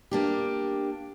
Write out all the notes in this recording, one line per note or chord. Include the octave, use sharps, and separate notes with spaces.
A#3 D4 G4